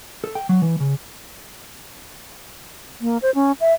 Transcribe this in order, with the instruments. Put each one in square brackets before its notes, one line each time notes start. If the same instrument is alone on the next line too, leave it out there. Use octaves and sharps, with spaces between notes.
[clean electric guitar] A4
G5
F#3
E3
C#3
[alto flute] A#3
C5
C#4
E5